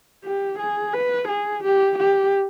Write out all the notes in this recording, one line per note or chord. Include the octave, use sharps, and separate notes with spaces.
G4
G#4
B4
G#4
G4
G4